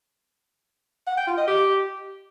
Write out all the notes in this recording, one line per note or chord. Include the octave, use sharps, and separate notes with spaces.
F#5
G5
F4
D#5
G4